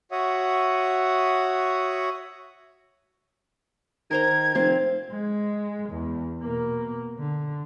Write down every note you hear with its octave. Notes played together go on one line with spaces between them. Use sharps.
F#4 C#5 E5 F#5 D#6
D#3 A#4 C5 A#5 G#6
F1 C4 F5
G#3
E2
B2 A#3
D3